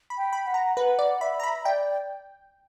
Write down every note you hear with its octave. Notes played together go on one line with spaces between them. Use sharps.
B5
G5
B5
F#5
A#5
B4 F#5
D5
E5 B5
A#5
B5
D5 G5